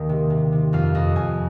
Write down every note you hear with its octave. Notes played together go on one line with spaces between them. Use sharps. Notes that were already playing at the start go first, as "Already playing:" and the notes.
Already playing: D#2 D#3 A#3 D#4
C3
C3
C3
F2 F5
F2 D#5
F2 G#5